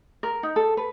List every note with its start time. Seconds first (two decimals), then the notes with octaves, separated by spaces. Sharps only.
0.23 A#4
0.43 D#4
0.56 A4
0.77 B4